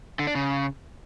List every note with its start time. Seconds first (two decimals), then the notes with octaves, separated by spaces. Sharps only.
0.19 D3
0.27 D4
0.35 C#3